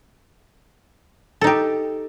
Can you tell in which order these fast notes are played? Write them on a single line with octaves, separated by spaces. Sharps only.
A4 D#4 G4